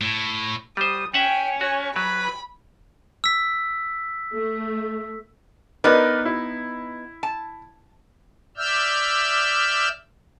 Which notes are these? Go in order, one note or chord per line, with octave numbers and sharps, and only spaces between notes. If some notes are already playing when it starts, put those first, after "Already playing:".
A2
G3 C5 D#6
C#4 E5 F#5 G5
F#4 C#5
F#3 B4 B5
E6 B6
A3
B3 D#4 A#4 B4 D5
E4
A5
D5 E5 E6 F6 G6